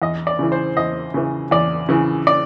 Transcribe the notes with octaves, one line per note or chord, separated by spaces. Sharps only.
E2 D#5
D5
C#3 E3
C5
E2 D#5
C#3 E3
E2 D5
C#3 E3
D5